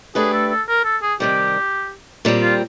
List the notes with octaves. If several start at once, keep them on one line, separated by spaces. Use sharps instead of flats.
A3 D4 G4 G#4 B4
A4
A4
A#4
A4
G#4
C3 D#3 G3 G4
A#2 G3 C4
F4